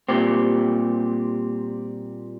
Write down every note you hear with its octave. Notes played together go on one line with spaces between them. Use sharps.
A#2 G3 C4 G4